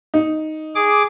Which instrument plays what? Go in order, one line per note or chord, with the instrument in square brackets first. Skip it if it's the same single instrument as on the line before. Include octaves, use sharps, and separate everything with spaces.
[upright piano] D#4
[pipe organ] G#4 D6